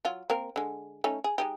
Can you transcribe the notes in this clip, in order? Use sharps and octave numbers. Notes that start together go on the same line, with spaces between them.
F#3 F4
A#3 C4 A#4
D3 G#3
A3 C#4 D#4
G#4
G#3 D#4 G4